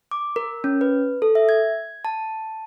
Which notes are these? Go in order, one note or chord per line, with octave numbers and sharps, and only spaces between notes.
D6
A#4
C#4
B4
A4
E5
G#6
A5